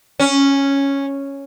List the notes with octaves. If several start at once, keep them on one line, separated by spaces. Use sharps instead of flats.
C#4